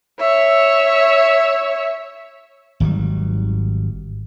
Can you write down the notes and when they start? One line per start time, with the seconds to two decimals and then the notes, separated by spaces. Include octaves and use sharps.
0.20 C#5 E5
2.80 G#1 D#3 F#3 G3